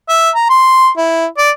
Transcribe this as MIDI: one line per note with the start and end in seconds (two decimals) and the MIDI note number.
0.09 0.30 76
0.35 0.46 82
0.50 0.88 84
0.97 1.26 64
1.38 1.50 74